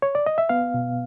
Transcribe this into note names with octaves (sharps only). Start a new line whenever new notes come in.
C#5
D5
D#5
E5
B3 F5
B2